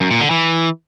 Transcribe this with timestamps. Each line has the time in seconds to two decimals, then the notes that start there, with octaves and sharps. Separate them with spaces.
0.01 F#2
0.11 A#2
0.21 D3
0.31 E3